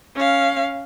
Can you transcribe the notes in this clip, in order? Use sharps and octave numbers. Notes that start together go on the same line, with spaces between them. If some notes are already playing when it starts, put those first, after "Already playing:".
C#4 F5